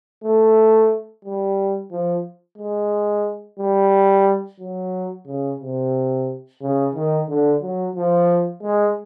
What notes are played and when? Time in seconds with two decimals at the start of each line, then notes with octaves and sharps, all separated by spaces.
0.24 A3
1.25 G3
1.92 F3
2.58 G#3
3.59 G3
4.60 F#3
5.27 C#3
5.60 C3
6.61 C#3
6.95 D#3
7.28 D3
7.62 F#3
7.96 F3
8.62 G#3